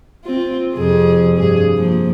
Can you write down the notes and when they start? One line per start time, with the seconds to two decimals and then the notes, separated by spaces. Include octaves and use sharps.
0.24 C4 F4
0.75 F2 C3 G#4
1.37 G2 G#4
1.77 F3 A#3